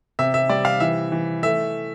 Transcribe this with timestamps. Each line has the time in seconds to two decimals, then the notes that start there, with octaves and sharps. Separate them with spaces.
0.19 C3 E5
0.34 E5
0.50 G3 D5
0.65 F5
0.80 E3 E5
1.12 E3
1.43 A3 E5